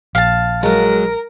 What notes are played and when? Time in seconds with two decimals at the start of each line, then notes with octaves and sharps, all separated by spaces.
0.15 A#1 F5 A5
0.63 F#3 G#3 A#4